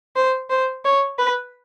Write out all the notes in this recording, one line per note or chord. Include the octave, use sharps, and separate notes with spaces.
C5
C5
C#5
B4